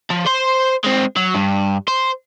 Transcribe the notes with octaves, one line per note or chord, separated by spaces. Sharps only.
F3
C5 C6
G#3 C4
F#3
G2
C5